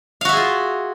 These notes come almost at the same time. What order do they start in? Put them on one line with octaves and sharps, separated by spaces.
F5 F#4 E5 G#4 F4